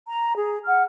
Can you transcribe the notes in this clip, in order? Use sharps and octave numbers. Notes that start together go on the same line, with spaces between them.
A#5
G#4
F#5 F6